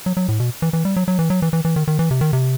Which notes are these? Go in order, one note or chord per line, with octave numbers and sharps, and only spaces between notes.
F#3
F#3
A2
B2
E3
E3
G3
F#3
F#3
E3
F#3
E3
E3
E3
D#3
D#3
E3
C3
D#3
C3